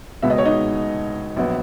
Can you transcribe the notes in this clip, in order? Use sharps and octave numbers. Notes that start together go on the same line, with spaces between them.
C#2 B2 G#3 B3 E5
D#5
C#5
D#4 D#5
A#1 F#3 B3